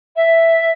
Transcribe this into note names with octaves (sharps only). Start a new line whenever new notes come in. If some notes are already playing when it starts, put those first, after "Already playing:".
E5